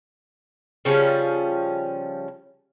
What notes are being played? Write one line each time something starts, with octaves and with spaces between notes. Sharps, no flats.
C#3 F3 G3 C#4